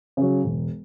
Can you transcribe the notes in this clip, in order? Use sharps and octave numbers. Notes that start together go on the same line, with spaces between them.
C#3 F#3
E1